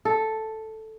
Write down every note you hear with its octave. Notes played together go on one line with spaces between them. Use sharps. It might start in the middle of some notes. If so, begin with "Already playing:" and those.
A4